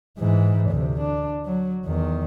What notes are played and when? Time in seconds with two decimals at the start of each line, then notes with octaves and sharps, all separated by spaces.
0.18 G#2 E3
0.70 D2 C3
1.00 D4
1.46 F#3
1.85 E2 D#3